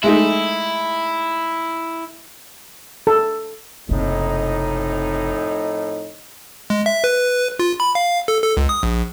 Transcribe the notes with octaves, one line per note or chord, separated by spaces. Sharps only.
G#3 A3 D#4 E4
A4
F#1 F2 A2 C3 D#4
G#3
E5
B4
F4
B5
F5
A4
A4
C#2
D#6
A#1